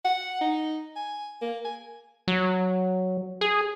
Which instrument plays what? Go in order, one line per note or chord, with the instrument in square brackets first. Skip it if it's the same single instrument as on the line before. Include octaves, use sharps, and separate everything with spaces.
[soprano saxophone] F#5
D#4
G#5
A#3
G#5
[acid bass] F#3
G#4